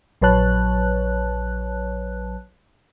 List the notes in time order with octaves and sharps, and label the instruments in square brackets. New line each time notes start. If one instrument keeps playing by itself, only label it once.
[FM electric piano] A#1 F#3 B4 C#5 A5 F#6